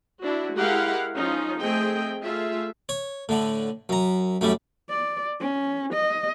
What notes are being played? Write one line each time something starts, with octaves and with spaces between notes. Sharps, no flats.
D4 E4 F#4
G#3 E4 G4 A#4 F5 F#5
F3 C#4 D#4 F4
A3 C4 G#4 D#5 G5
A3 F4 G#4 E5
C#5
A2 D3
F#2 A#5
F#2 A2 G3
D5
C#4
D#5